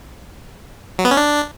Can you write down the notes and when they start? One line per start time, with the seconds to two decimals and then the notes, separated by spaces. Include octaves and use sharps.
0.99 F#3
1.05 B3
1.11 C#4
1.17 D4